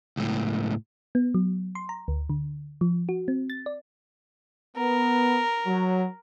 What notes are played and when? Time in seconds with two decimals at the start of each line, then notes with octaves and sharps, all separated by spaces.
0.17 C#2 A2
1.15 B3
1.34 F#3
1.75 C6
1.89 A#5
2.08 D2
2.30 D3
2.81 F3
3.09 F#4
3.28 C4
3.50 A6
3.66 D5
4.77 B3 A#4
5.67 F#3